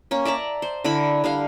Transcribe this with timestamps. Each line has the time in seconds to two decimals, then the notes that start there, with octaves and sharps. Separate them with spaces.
0.11 A#3 C#4
0.25 D5 E5 A5 A#5
0.62 C5
0.84 D3 E4 A#4 B5
1.24 D3 G3 F5